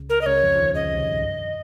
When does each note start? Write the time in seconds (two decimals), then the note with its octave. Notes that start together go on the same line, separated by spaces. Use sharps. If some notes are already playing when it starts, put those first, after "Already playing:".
Already playing: C#2 C#3
0.10 A#4
0.21 D#5
0.26 C#2 C#3 C#5
0.43 F2 F3
0.55 F3
0.59 D#2 D#3
0.75 C#2 C#3 D#5
0.92 C2 C3
1.07 G#2
1.25 G2